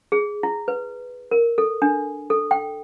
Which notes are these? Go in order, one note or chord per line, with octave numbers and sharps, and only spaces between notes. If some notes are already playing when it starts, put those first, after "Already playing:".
G#4
E4
B4
A#4
A4
D4
A4
G5